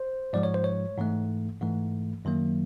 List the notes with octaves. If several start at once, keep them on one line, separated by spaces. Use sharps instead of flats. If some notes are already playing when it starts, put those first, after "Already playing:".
Already playing: C5
G#2 F3 G#3 D5
C#5
C5
C#5
G#2 E3 A3
G#2 E3 A3
F#2 D#3 F#3 A#3